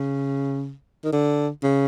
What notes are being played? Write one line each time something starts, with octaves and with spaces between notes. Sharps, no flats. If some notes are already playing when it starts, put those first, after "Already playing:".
Already playing: C#3
D#3
D3
C#3